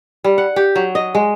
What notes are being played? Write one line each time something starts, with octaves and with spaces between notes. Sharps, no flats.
G3
F#5
G4
F#3
D#5
G#3